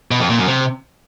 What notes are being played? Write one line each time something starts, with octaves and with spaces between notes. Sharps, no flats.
B2
F2
A#2
F#2
C3